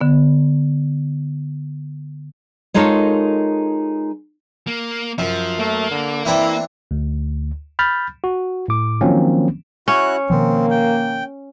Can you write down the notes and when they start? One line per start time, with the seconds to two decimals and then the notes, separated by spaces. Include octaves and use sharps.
0.01 D3 B3
2.74 G#3 D#4 F4 A4 A#4 C#5
4.67 A#3
5.19 F#2 F3
5.59 A3 A#3
5.91 D3
6.25 E3 C4 D4 E4
6.91 D2
7.79 B5 F6 G6 A6
8.24 F#4
8.68 A2 D6
9.01 D#3 F3 F#3 A#3 C4 C#4
9.88 C#4 E4 F#4 F#6
10.30 B2 D#3 F3 A#3 C4
10.70 G5